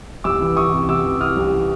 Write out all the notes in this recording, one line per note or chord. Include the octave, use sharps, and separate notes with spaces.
C2 D6 E6
E3
E3 C#6 D#6
C3
C3 D6 E6
E3
C3 D#6 F6
C2